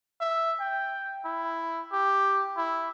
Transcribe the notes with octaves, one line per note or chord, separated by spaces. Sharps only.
E5
G5
E4
G4
E4